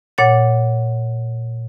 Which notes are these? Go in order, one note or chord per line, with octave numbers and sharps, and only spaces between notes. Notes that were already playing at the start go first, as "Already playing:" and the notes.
A#2 C#5 F#5 A6